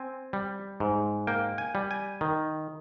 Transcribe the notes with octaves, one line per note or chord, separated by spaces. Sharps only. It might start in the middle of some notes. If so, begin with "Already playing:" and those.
Already playing: C4 G#5
G3
G#2
A#3 G5
G#5
G3
G#5
D#3